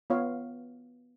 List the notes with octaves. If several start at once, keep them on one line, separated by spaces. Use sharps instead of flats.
B3 F4 C#5 F5